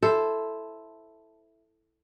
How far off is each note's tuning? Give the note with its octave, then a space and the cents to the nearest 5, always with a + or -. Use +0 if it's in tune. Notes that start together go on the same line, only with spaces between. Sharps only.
E4 +0 A4 +0 C5 +0